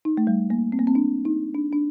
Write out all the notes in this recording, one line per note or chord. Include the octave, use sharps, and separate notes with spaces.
D#4
A3
G3
A#3
C4
A#3
C4
D4
D#4
D4
D4